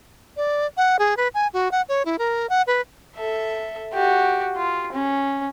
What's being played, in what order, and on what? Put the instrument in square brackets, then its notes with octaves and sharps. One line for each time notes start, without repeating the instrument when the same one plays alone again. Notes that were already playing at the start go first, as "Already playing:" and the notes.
[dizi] D5
F#5
G#4
B4
G#5
F#4
F#5
C#5
E4
A#4
F#5
B4
[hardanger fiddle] A4 E5
F#4 G4
F4
C#4